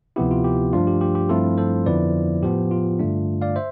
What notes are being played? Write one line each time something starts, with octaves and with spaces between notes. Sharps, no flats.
D2 C3 F3 B3 E4 G4
F4
G4
G2 F3 A3 D4 F4
G4
G4
G4
G2 F3 A3 C4 E4 F4 A4
A4 C5
F2 D3 F3 B3 E4 B4 D5
A2 F3 B3 G4
F4
G2 D3 A3 D4
D5 F5
C5 E5